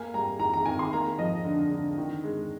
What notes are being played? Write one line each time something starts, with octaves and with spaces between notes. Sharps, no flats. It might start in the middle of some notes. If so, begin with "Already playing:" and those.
Already playing: A#3 G#5
G3 A#5
D#3 A#5
A#5
D#3 G#5
C6
A#3 A#5
F3 D#5
D3
D3
D#3
G#3